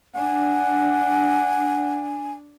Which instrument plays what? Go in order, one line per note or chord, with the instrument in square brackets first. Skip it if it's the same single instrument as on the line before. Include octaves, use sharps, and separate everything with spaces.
[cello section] D4 [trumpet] F#5 [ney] G#5